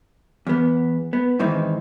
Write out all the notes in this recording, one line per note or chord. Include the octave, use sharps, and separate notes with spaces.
E2 B3
B3
G#2 D#3 E3 C4 D#4